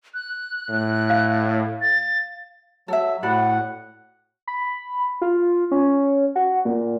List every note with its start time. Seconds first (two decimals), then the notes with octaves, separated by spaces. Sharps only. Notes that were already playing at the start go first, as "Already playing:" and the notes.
0.14 F#6
0.69 A2
1.10 F5
1.81 A6
2.88 F#3 A4 E5
3.23 A2 F#4 D5 F#5 B5
4.47 B5
5.21 F4
5.71 C#4
6.36 F#4
6.65 A#2